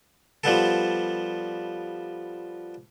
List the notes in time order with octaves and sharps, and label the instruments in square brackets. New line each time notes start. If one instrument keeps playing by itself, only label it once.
[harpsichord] F3 G3 B3 A4